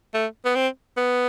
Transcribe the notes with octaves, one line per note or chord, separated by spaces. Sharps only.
A3
B3
C4
B3